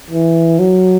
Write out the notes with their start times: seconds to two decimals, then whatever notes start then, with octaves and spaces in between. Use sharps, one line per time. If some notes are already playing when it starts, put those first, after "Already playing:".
0.11 E3
0.59 F#3